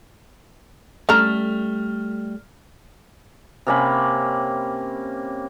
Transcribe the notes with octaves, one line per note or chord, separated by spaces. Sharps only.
G3 A3 C#4 A4 A#5 F6
C3 A#3 C#4 B5